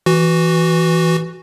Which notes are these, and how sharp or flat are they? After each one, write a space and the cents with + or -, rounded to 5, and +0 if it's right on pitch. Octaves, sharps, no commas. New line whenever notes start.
E3 +0 F#4 +0